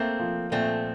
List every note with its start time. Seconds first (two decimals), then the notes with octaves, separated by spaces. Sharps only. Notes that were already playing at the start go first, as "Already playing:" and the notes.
Already playing: A3 A#3 C4
0.20 F3
0.51 A#2 A3 C4